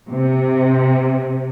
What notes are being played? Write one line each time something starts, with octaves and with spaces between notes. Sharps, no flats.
C3